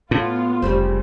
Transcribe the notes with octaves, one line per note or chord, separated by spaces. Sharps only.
A2 B3 F4
F1 C#3 G3 C4 F4 C5